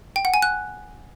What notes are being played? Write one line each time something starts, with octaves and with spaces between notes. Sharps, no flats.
G5
F#5
G#5
F#6